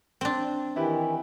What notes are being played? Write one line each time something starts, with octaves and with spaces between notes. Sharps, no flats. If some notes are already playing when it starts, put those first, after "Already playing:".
C4 D4
D#3 E3 E4 G4 B4